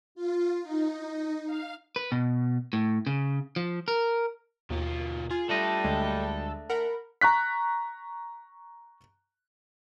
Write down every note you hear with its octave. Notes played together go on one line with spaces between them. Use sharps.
F4
D#4
F5
B4
B2
A2
C#3
F3
A#4
D#2 B2 F4
F4 G#4
G3 A3 D4 A4 D#5
D2 D3 G#3
A#4 F#5 B5
A#5 C#6 F#6 B6